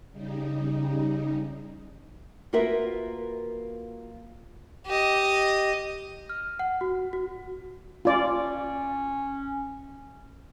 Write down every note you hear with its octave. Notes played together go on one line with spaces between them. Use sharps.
C#3 G3 D#4
A#3 F4 F#4 A#4 B4 E5
G4 D#5
F6
F#5
F#4
F#4
C#4 F4 D5